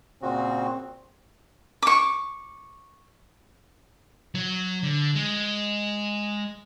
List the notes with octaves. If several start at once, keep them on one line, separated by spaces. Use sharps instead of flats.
A#2 C#3 C4 F#4
C#6 D6
F#3
D3
G#3